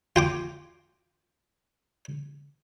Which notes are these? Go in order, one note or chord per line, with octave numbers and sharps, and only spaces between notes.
F4 G5 D6